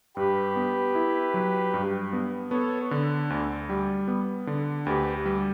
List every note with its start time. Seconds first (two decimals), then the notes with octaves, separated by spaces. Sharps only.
0.16 G2 G4 B4
0.56 B3
0.95 E4
1.34 F#3
1.74 G2
2.13 B3
2.51 B3 A4 C#5
2.91 D3
3.30 D2
3.69 G3
4.08 B3
4.47 D3
4.86 D2 G4 B4
5.25 G3